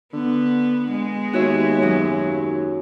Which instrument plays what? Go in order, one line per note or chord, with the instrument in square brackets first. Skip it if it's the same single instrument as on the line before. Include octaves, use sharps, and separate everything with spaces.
[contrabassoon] D3 [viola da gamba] B3
[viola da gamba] G#3 B3
[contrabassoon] D#2 [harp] F#4 C#5 E5
[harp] F#2 F#3